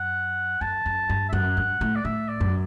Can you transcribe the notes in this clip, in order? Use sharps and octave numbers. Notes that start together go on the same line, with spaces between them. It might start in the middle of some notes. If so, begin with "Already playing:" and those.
Already playing: F#2 F#5
F#2 A5
F#2
G2
E5
F#2 F#5
G2
A2
D5
A2 E5
D5
F#2